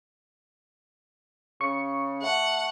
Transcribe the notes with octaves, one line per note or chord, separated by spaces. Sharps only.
C#3 C#6 C#7
A3 F#5